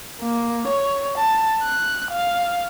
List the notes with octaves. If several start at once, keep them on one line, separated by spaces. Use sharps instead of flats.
A#3
C#5
A5
F#6
F5